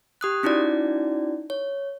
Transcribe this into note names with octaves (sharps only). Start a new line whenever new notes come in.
G4 D#6 F#6
C#4 D#4 E4 F#4 D5
C#5